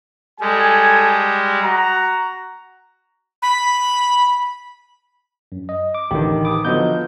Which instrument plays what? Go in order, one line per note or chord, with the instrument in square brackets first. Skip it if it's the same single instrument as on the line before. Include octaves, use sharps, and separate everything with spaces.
[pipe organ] G3 G#3 [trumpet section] A4 G#5
[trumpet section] F#4 A#5
[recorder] B5
[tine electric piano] F#2
D#5
D6
[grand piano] A1 D#3 [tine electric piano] D3 A3 G4
[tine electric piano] B5 D6 D#6
[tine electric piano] D3 D#5 G6 [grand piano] F3 F#3 B3